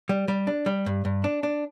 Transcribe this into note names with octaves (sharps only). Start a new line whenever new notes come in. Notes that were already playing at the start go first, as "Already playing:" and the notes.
G3
G3
D4
G3
G2
G2
D4
D4